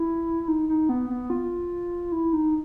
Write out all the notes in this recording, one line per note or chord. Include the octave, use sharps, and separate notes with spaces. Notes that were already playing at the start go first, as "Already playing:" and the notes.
Already playing: E4
D#4
D#4
B3
B3
F4
E4
D#4